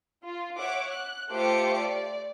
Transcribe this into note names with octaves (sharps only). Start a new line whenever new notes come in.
F4
C#5 E5 F#5 D6
F#6
A3 F4 G4 C5 D6 C#7
D5